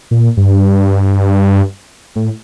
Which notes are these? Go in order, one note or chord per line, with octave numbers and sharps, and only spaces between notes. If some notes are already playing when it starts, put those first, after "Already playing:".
A#2
G2
A2